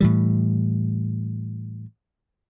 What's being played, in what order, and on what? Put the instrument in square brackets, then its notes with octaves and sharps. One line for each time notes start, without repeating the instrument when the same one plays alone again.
[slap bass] A2 E3 G3